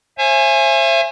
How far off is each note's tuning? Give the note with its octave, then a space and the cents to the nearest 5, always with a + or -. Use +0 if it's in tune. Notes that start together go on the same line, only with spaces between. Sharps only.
C5 +45 E5 +30 G#5 +0